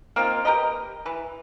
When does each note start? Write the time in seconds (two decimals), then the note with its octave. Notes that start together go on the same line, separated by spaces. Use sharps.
0.16 A#3 C4 D#4 F4
0.45 G4 A#4 B4 D#5
1.06 E3 B4